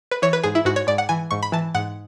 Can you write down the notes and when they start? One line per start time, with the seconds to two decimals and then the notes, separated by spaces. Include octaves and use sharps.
0.11 B4
0.22 E3 C#5
0.33 B4
0.44 G#2 G#4
0.55 E4
0.65 G#2 F#4
0.76 C#5
0.87 G#2 D5
0.98 F#5
1.09 E3 G#5
1.31 G#2 C#6
1.43 B5
1.52 E3 A5
1.75 G#2 F#5